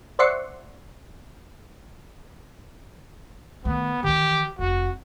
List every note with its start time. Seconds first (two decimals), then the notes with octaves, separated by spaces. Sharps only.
0.19 C5 D5 E5 F#5 C6 C#6
3.65 D#3 A3 B3
4.03 D#3 E3 G4
4.59 F1 F#4